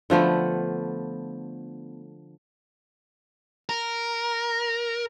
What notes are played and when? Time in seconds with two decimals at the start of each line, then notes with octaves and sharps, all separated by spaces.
0.10 D3 F3 A3 B3
3.69 A#4